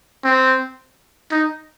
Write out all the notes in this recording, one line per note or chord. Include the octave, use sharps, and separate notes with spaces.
C4
D#4